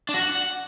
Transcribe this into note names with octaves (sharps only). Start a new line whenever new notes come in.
D4
F#4
F#5